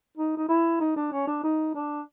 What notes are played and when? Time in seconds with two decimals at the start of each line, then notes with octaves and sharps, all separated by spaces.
0.17 D#4
0.37 D#4
0.49 E4
0.80 D#4
0.96 D4
1.12 C#4
1.27 D4
1.44 D#4
1.75 D4